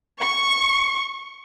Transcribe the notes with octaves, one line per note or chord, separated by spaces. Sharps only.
C#6